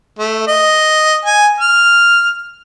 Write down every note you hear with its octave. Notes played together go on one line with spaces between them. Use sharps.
A3
D#5
G#5
F6